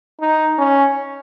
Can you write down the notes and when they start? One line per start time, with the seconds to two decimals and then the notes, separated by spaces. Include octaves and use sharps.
0.21 D#4
0.58 C#4